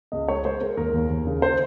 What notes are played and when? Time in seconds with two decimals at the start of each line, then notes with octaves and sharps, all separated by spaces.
0.12 C#2 D#5
0.28 G#3 C#5
0.45 G#3 C5
0.61 G#3 A#4
0.77 D#2 A#4
0.94 D#2
1.10 D#2
1.27 C#3
1.42 C5